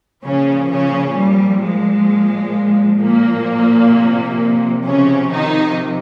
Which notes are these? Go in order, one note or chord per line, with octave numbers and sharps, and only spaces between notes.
A#2 C#3 F3 C#4
C#3 C#4
G3
G#3
A#2 A#3
C3 F3
C#3 C#4
D#3 D#4